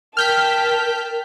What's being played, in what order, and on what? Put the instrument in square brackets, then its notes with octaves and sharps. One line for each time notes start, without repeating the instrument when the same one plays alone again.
[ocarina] A#4 [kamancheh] G5 A5 [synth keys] F6 G6 B6